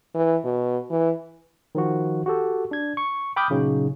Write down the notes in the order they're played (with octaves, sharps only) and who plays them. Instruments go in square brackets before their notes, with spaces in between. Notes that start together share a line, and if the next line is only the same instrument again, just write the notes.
[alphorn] E3
B2
E3
[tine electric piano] D#3 F3 F#4
F#4 G4 A4
D4 G#6
C#6
G5 B5 D6 D#6 F6 G6
A#2 C#3 F#3 C#4 D#4